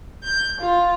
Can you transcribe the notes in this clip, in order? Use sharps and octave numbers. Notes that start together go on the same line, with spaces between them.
G6
F4